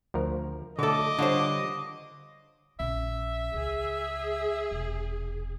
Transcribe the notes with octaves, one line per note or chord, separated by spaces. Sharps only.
D2 F3 A#4
B1 D3 A3 A4 D#5 D6
D3 G3 D4 F4 C5 C#5
A#1 C#4 E5
C#2 G#4
E1 C3